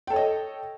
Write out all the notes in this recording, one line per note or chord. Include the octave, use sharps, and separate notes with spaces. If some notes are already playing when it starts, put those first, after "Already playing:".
A4 C#5 D#5 G5